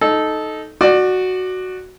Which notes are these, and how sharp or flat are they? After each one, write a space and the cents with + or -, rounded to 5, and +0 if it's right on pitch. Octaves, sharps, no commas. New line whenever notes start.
D#4 +0 A4 -15
F#4 +0 D5 +20